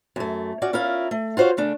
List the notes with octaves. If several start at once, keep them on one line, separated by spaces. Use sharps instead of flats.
F#2 A3
C#4 F#4 D5
C#4 E4 F4 A#4 F5
A3
F4 F#4 C5 C#5 F5
C#3 A3 D4